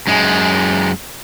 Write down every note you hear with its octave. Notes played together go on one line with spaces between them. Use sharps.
F#2 G#3